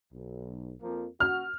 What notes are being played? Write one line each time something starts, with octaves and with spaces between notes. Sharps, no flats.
B1
F2 F3 A#3
F#4 F6